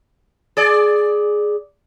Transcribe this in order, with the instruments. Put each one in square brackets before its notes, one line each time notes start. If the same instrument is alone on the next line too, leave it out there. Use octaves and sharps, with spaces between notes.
[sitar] G#4 D5